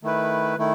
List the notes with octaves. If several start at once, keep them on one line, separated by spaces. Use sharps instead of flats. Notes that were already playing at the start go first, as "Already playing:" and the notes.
D#3 A3 E4 B4
D#3 A3 E4